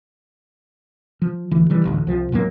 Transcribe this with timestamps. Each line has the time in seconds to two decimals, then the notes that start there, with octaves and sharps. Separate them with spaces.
1.22 F3
1.51 D2 E3
1.70 D#3 E3 G3
1.85 A1 D2
2.07 C2 F3
2.32 D#2 G#2 F#3 A#3